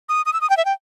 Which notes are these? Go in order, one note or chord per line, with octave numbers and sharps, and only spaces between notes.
D#6
D#6
E6
D#6
G5
E5
G5